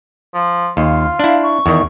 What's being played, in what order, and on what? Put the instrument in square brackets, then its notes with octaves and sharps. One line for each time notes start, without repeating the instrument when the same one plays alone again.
[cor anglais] F3
[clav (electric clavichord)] D#2 [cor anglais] F4 [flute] F6
[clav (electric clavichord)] D4 E4 [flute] F5
[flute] C#6
[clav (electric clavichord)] E2 D#3